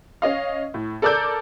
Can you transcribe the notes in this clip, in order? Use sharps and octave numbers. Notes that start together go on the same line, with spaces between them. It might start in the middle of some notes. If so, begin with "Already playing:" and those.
C#4 D#5 F5
A2
A4 A#4 D5 D6 E6 G6